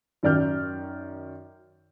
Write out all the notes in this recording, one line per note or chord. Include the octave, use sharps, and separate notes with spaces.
F#2 D#3 D5 F6 G6